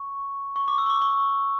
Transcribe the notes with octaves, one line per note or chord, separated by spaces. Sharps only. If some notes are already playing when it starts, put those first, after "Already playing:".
Already playing: C#6
C#6
D6
E6
C#6
D6
C#6